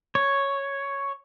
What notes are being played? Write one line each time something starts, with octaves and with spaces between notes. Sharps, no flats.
C#5